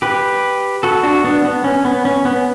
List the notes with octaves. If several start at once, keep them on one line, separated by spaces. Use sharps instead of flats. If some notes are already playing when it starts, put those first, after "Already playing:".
G4 B4
F#4 A4
D4 F#4
B3 D4
B3
C#4
B3
C#4
B3